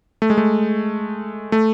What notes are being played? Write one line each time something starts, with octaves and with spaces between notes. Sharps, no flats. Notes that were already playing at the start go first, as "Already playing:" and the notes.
A3
G#3
A3
A3